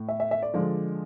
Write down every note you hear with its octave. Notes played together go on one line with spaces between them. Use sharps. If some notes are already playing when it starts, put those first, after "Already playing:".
Already playing: A2
E5
E5
E5
D5
D3 F3 G#3